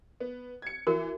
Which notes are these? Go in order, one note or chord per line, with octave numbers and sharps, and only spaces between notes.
B3
G#6 C#7
E3 F#4 A#4